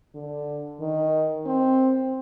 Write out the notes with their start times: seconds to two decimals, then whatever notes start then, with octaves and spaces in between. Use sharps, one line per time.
0.15 D3
0.80 D#3
1.46 C4